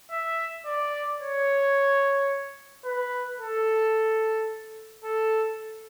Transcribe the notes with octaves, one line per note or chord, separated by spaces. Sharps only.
E5
D5
C#5
B4
A4
A4